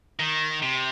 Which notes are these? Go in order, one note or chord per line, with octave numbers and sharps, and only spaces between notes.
D#3
C3